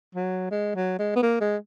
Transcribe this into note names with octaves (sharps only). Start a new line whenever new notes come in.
F#3
G#3
F#3
G#3
B3
A#3
G#3